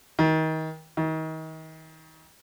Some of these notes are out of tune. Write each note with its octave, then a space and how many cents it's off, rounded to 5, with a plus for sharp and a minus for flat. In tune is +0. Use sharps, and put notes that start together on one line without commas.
D#3 +30
D#3 +35